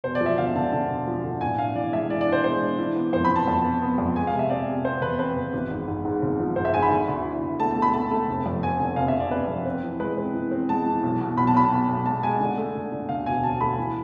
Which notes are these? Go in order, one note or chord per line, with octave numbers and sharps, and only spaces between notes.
E1 C5
D5
F3
E5
D3 F5
D3 A5
D3
E1
F3
D3
A2 G#5
D4 F5
E3 D5
G#3 E5
E3 D5
D5
D4
C5
G#3 C5
D4
E3
B3
F2 C5
B5
B3
A5
F2
B3
B3
F2
G#3 G#5
F5
C3
E5
C4 D5
C3
C4 C5
E2 B4
C4 B4
E2
G#1
G#2
G#2
G#2
G#1
F3
G#2 C5
E5
G#2 G#5
B5
D3
D2
E4
D2
A3 A5
A5
A3
B5
A3 A5
A3
F1
F2
F1 G#5
D3 G#5
F1 F5
E5
F1
D5
F1 B4
F2
C4
E3
G#3 B4
C4
E3
C4
G#3 A5
E3
B1
B2
B1 B5
A5
B1 B5
B1
B1
G#3 A5
G#3 G#5
D3
A3
D3
D3
D2 F5
E1 G#5
D2 A5
A3 B5
E3